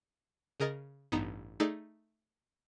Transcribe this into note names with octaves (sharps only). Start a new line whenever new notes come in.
C#3 G#4 A#4 D#5 A6
A1 G2 B3 D#4 A#5 E7
A3 D#4 G#4 A4 D5